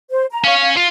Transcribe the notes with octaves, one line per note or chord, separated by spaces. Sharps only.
C5
A#5
C#4 C#5 F5
F4